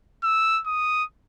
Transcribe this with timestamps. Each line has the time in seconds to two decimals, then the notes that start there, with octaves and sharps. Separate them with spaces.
0.24 E6
0.66 D#6